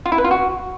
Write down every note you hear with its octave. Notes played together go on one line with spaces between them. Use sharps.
F4
E4
B4
F4
F#4